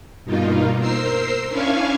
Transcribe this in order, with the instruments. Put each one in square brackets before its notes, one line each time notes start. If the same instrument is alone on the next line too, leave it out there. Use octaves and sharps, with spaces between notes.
[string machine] G2 B2 A#3 D#4 F4
A#4 C5 E6 C7
C#4 D4 E4 F5 G#5 C#6